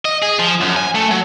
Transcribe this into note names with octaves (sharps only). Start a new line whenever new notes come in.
D#5
G#4
F3
F#2
G#5
A3
F#3